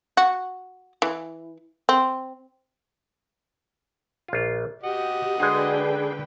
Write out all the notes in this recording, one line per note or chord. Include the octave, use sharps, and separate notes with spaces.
F#4
E3
C4
A#1 F4
F#4 G4 D#5 F#5
D3 G#3 D4 G#4 B4 C5 F#5 G5